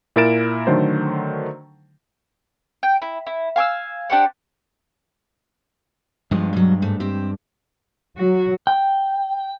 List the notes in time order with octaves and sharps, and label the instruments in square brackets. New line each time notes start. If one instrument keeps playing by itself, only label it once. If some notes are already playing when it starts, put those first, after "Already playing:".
[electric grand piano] A#2 E4 A#4 A6 D7 E7
D3 D#3 F#3 A3 C5
[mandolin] G5
E4
E4
F5 G#5 D6 E6
D4 G4 C5 F#5
[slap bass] G2 G#3 [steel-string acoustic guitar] F3 B3
[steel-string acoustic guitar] B2 F#3
G#2 A3
C4 G4 E5
[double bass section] F#3 [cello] F#4
[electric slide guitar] G5